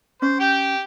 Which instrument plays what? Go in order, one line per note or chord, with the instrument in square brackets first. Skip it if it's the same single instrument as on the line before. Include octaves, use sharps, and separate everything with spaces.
[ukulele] C#4 [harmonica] C5
[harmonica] G4 G5